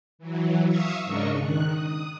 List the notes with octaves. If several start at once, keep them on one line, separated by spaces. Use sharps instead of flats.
E3 F#3
E5 F5 C#6 D#6 E6
G#2 C#3 D4 A#4 D#5 C#6
D#3 F#6
D#6